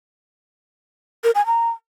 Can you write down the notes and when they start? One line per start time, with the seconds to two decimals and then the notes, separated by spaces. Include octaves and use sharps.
1.24 A#4
1.35 G#5
1.46 A#5